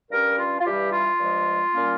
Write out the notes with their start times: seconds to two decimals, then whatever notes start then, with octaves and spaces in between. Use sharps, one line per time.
0.11 G2 G3 C#4 A#4
0.39 F4
0.60 F4
0.65 G2 E3 G3 G4
0.92 F4
1.19 G2 F3 G#3
1.73 A#2 G3 A#3 C#4